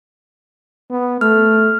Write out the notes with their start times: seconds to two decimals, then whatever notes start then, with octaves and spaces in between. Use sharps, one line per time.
0.90 B3
1.21 A3 F6